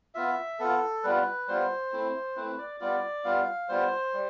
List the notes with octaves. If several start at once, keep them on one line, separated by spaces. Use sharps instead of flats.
B3 F4 E5
B3 F4 A4
G3 B3 F4 B4
G3 B3 F4 C5
A3 C4 E4
A3 C4 E4 B4
D5
G3 B3 F4 D5
G3 B3 F4 F5
G3 B3 F4 C5
G3